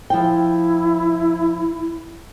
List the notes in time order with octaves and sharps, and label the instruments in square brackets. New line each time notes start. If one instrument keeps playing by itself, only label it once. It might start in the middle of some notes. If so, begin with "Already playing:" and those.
[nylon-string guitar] F3 G5 [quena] E4